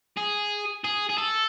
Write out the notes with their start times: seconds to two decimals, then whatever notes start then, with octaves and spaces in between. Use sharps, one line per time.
0.17 G#4
0.84 G#4
1.09 G#4
1.18 A4